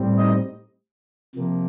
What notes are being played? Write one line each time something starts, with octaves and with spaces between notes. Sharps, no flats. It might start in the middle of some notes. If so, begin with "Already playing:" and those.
Already playing: A2 G3 C4
D#4 D#5
C3 F3 A#3